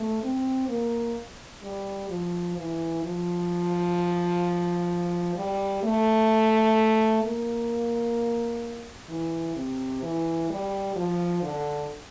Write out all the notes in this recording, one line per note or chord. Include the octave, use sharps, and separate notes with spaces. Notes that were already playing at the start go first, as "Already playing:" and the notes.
Already playing: A3
C4
A#3
G3
F3
E3
F3
G3
A3
A#3
E3
C3
E3
G3
F3
D3